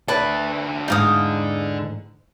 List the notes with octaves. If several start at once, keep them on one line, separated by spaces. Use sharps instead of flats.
D3 B4 D5 E5 A5
E2 G#2 D#4 F5 D#6